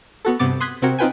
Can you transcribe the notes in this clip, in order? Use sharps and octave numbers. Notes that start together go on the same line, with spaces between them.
B3 F#4 A4
G2 C3 B3 D6 A6
C6 D#6 F#6 G#6 B6
C3 C4 F#4 A#4 G#6 C#7
C4 D#4 F4 B4 G5 G#5